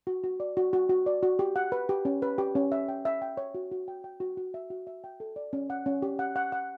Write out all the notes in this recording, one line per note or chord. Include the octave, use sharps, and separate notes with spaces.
F#4
F#4
D5
F#4
F#4
F#4
D5
F#4
G4
F#5
B4
G4
C#4
B4
G4
C#4
E5
G5
E5
G5
C#5
F#4
F#4
G5
G5
F#4
F#4
E5
F#4
E5
G5
A4
D5
C#4
F#5
C#4
G4
F#5
F#5
F#5